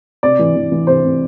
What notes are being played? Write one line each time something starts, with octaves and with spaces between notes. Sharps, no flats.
C3 D5
E3
E3
E3
C3 C5
C3